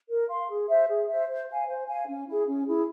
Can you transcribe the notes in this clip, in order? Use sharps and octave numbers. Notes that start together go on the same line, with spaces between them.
A#4
F5 C6
G#4
C5 E5
G#4
C5 E5
C5
F5 G#5
C5
F5 G#5
C#4
E4 G#4
C#4
E4 G#4